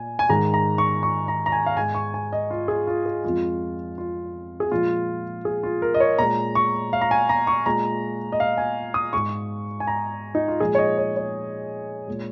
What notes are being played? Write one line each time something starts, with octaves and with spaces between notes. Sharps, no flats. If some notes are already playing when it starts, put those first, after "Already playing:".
Already playing: A#2 G#5
G#5
G#2 D#3 G#3 A#5
A#5
C#6
C#6
A#5
A#5
G#5
F5
G#2 G#3 G#5
C#6
G#5
D#5
F4
G#4
F4
G#4
F2 F3 G#3 F4
F4
G#4
A#2 F3 G#3 F4
G#4
F4
A#4
D#5
C#5
A#2 G#3 A#5
C#6
F5
A#5
G#5
A#5
C#6
A#2 G#3 A#5
D#5
F5
G#5
D#6
G#2 G#3 C#6
G#5
A#5
D#4
F4
A#2 F3 G#3 G#4
C#5
D#5
C#5
C#5
A#2 G#3